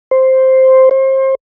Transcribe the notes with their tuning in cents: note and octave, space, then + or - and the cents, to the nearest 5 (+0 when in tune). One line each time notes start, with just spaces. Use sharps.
C5 +0
C5 +30